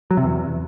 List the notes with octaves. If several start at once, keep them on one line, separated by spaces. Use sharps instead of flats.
F#3
C3
E2